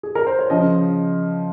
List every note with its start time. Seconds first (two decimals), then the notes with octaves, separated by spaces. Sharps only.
0.03 G#4
0.15 A#4
0.26 C5
0.39 C#5
0.50 C#3 F3 D#5